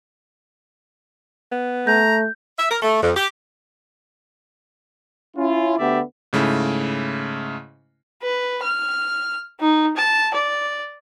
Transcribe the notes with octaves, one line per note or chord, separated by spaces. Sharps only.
B3
A3 A#5 G6
E5
A#4
A3
F2
G4
C#4 E4 F4
D2 D3 B3 G4 D5 E5
G#2 C#3 A3 E4
B4
F6
D#4
A5
D5